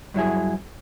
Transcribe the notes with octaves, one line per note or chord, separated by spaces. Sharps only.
G2 F#3 E4 G#4